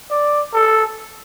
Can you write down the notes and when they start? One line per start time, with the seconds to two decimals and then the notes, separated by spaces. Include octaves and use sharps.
0.10 D5
0.53 A4